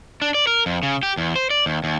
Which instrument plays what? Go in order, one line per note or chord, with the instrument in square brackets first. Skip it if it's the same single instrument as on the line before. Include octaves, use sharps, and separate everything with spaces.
[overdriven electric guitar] D4
D5
A#4
F2
C#3
G4
E2
C5
D5
D#2
D#2